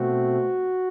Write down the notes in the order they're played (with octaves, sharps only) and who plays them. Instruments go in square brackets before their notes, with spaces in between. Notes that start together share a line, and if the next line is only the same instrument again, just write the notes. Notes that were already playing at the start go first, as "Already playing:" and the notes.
Already playing: [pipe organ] B2 A3 C4 F#4